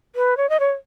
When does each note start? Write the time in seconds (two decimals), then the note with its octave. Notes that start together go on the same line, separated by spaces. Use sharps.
0.16 B4
0.37 C#5
0.49 D#5
0.60 C#5